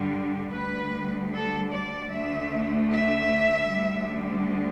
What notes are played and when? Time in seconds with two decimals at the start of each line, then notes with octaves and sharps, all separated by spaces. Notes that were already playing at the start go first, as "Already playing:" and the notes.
Already playing: G2 D3 G3
0.53 D2 D3 G3 B4
1.33 A4
1.72 D5
2.12 D2 D3 A3 E5
2.93 E5
3.72 D2 D3 G3